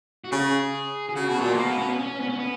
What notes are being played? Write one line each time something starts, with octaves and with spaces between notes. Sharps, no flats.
F#4
C#3 G#4
G#4
C#3 F#4
B2
A#2 F#3
G#3
B2 A#3
B3
C#4
B3
C#4
B3
C#4
B3